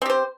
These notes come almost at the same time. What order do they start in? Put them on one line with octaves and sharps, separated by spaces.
C4 G4 C5